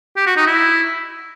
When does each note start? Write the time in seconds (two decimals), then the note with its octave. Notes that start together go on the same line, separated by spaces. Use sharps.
0.16 G4
0.26 F#4
0.37 D#4
0.47 E4